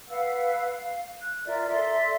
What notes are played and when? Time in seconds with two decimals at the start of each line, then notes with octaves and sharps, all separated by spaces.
0.08 B4 F5 F#5 E6
0.63 F5
1.20 F#6
1.45 F4 A#4 D5 E5
1.68 A4 D5 E5 C6